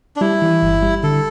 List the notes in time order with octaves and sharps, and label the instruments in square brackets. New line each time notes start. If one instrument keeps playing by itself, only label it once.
[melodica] D4
[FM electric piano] G3 [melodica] E4
[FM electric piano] E3
G1
G3
[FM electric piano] D3 [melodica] A4